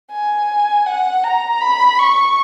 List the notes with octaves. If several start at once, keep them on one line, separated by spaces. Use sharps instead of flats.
G#5
F#5
A#5
B5
C#6